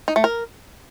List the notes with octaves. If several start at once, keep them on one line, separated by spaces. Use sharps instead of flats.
D#4
A3
A#4